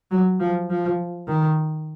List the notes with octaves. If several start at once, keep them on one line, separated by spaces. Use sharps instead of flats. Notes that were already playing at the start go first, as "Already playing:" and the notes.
F#3
F3
F3
D#3